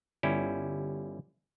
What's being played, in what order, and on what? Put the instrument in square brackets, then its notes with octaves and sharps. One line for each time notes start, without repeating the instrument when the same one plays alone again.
[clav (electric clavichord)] G1 G3 C#4 E4